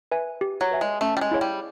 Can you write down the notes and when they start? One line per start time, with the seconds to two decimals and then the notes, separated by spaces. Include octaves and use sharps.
0.12 B4 E5 G#5
0.41 G4
0.61 F#3
0.71 B4 E5 G#5
0.81 G#3
1.01 A3 C#4
1.17 G3
1.21 G#3
1.31 E4 G#4 C#5 F5
1.41 G3